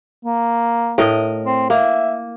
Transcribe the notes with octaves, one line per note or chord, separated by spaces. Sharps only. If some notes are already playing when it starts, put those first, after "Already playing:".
A#3
A2 A#4 D#5
C4
A#3 E5